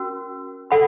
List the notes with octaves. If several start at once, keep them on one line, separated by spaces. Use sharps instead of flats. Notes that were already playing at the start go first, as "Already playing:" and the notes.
Already playing: C#4 F#4 A#4
A4 F#5 B5